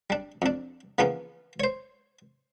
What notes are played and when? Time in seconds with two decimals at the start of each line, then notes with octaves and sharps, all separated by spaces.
0.10 G3 D4
0.42 F2 D4
0.98 C#3 E3 F3 A#3 B3 C#4
1.60 C5 C#5